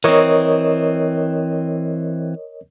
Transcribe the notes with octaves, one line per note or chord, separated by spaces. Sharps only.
E3 C4 A#4 C#5 D#5